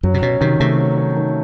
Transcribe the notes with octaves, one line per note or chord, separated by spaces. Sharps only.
F#2 F#3
C3
B2 C#4
C3 D#3
C3 A3
F#3
C#4
D#3